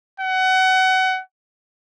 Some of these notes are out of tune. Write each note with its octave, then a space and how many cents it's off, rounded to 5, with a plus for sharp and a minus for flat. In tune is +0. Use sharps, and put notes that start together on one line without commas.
F#5 +25